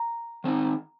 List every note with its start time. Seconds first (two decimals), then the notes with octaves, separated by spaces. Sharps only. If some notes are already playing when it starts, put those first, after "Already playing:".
Already playing: A#5
0.44 D#3 C4 D#4